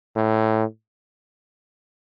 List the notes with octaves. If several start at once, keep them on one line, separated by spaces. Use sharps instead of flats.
A2